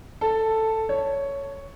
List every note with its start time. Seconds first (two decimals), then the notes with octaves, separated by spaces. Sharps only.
0.21 A4
0.89 C#5